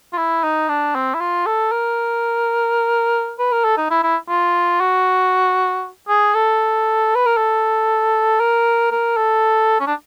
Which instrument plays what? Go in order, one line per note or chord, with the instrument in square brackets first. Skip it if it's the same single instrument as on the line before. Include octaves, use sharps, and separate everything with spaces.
[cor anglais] F4
E4
D#4
D4
C4
E4
F4
A4
A#4
B4
A#4
A4
D#4
E4
E4
F4
F#4
G#4
A4
B4
A#4
A4
A#4
A#4
A4
C#4
D4